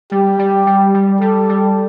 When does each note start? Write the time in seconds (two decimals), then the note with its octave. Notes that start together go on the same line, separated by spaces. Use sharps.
0.12 G3 G4
0.39 G3
0.67 G3
0.94 G3
1.21 G3 A4
1.49 G3